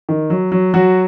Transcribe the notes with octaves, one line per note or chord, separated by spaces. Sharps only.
D#3
F#3
F#3
F#3 F#4